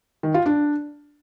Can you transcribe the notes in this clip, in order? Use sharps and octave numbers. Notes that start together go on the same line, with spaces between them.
D#3
F4
D4